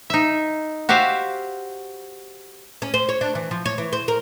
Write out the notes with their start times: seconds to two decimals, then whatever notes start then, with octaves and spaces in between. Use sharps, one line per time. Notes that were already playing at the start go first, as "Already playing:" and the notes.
0.10 D#4 E5
0.89 F#4 G4 C5 E5 F5
2.82 C#4
2.94 C5
3.09 C#5
3.21 D4
3.35 E3
3.51 F3
3.66 C#5
3.78 E3
3.93 C5
4.08 A#4